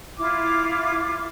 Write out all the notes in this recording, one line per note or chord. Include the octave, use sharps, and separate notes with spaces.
E4 F4 D6